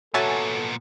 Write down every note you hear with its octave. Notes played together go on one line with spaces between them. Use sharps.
A#2 B3 F#4 A4 C#5 E5 G#5 A5